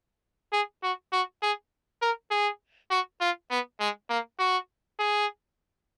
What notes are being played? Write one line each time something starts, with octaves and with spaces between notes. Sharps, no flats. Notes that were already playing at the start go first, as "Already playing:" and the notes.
G#4
F#4
F#4
G#4
A#4
G#4
F#4
F4
B3
G#3
A#3
F#4
G#4